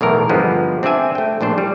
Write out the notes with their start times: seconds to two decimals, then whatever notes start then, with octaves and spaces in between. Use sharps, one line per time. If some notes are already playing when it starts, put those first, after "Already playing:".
0.01 B1 E2 A2 A#4
0.29 G2 D3 F3 G#3 B3
0.83 C4 D4 D5 E5 G#5
1.15 A3 G5
1.41 A#1 A2 D4 C5
1.58 G3